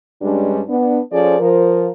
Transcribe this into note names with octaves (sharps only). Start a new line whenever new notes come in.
G2 G3 G#3 C#4 D4
B3 D4
F3 C#4 G#4 A4 C5 D5
F3 A#4